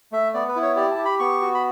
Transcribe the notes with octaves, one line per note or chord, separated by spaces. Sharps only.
A3 E5
B3 D5
B4
E4
C#5
G4 D5
A5
G4
B5
B3 C#6
F#4
B5